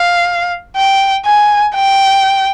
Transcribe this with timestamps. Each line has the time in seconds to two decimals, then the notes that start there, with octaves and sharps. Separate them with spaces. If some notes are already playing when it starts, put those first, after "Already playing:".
Already playing: F5
0.76 G5
1.25 G#5
1.75 G5